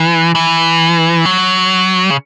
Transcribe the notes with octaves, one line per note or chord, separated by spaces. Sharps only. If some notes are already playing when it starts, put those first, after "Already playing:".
Already playing: E3
E3
F#3
C#3